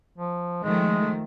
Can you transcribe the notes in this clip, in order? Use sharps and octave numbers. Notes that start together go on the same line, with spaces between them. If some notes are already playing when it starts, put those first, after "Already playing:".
F3
D#3 F3 G#3 A3